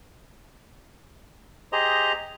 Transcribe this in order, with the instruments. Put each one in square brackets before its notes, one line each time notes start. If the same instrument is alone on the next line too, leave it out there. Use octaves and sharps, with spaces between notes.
[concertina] G4 G#4 C5 D#5 A#5